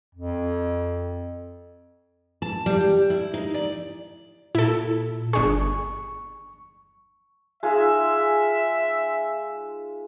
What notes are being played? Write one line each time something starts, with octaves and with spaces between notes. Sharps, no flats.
F2
A5
G3
G4
E4
D#4
D5
A#2 E4 A4
G1 D4 G#4 C#6
G#3 D#4 F4 E5